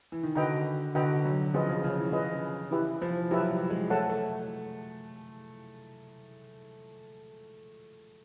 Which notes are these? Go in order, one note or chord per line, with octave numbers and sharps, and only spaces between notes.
E3
D#3
D3 F#4 B4 D#5 G5 A#5
D3 F#4 B4 D#5 G5 A#5
F#3
F3 C#4 F4 G#4 B4 D#5
C#3
C#3
E3
C#4 F4 G#4 B4 D#5
E3 E4 G4 B4 E5
F3
F#3 E4 G4 B4 E5
G3
G#3
A3 A4 C#5 F#5 A5
A3